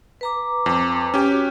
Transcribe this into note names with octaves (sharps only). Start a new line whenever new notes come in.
B4 A#5 D6
F2
C#4 G4
F#4